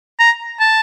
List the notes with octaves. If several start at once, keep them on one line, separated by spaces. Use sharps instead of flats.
A#5
A5